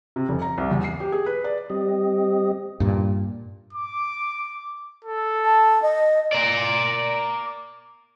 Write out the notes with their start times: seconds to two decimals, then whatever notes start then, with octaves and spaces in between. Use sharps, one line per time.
0.16 C3
0.29 F1
0.42 A#5
0.58 C2
0.71 E2
0.84 C7
1.00 G4
1.12 G#4
1.26 B4
1.44 D5
1.70 G3 C4 G4 D#5
2.80 G2 A#2
3.73 D6
5.05 A4
5.45 A5
5.82 D#5
6.33 A#4 D5